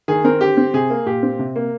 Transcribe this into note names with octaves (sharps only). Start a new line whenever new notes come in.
D#3 G#4
C4 A#4
D3 G4
C4
C3 G#4
A#3
A#2 G4
C4
C3
A#3